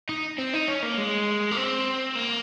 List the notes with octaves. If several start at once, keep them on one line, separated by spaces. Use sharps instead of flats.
D#4
C4
D#4
C#4
A#3
G#3
A#3
C4
A#3